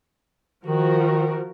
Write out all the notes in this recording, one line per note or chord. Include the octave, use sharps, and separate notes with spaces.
D#3 F3 F#4 A#4